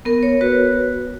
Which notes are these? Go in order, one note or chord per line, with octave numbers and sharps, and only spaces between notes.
B3 A#4
C#5
F#4 B4